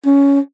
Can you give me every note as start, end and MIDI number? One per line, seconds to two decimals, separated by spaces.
0.05 0.40 61